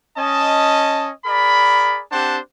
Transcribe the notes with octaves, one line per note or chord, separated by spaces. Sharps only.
C#4 D#5 A5
G#4 A#4 D5 B5
C4 D4 G4 C5 F#5 A5